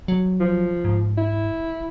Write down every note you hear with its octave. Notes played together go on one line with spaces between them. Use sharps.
F#3
F3
G#2
E4